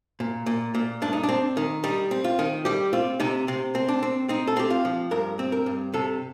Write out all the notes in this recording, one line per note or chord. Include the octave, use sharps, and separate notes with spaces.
A#2
A#2
A#2
G2 D4
D#4
D4
C4
D#3
G3 D#4
C4
F4
D#3
G3 G4
C4 F4
C3 D#4
C3 C4
C4
D4
C4
C4 D#4
A4
C4 G4
F4
F3
G2 A#4
C4
A#4
G2
C3 A4